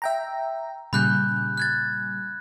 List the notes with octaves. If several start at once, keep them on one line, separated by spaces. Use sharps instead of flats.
E5 G5 A#5
A#2 C#3 G3 B5 F#6 G6
F#6 G#6 A6